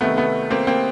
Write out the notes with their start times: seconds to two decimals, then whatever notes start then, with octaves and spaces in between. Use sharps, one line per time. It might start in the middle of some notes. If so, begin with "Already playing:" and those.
0.01 C2 C3 D#3 A3 B3
0.17 A3 B3
0.51 A#3 C4
0.67 A#3 C4